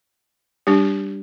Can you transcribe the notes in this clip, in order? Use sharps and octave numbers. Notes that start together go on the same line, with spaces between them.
G3 D4 G4